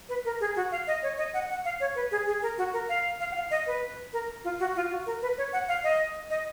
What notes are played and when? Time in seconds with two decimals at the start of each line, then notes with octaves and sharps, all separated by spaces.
0.09 B4
0.25 A#4
0.40 G#4
0.56 F#4
0.72 F5
0.87 D#5
1.03 C#5
1.18 D#5
1.34 F#5
1.49 F#5
1.65 F5
1.80 C#5
1.95 B4
2.11 G#4
2.27 G#4
2.42 A#4
2.58 F#4
2.73 A#4
2.89 F5
3.20 F5
3.32 F#5
3.35 F5
3.51 D#5
3.67 B4
4.13 A#4
4.44 F4
4.60 F#4
4.76 F4
4.91 F#4
5.06 A#4
5.22 B4
5.38 C#5
5.53 F#5
5.68 F5
5.84 D#5
6.30 D#5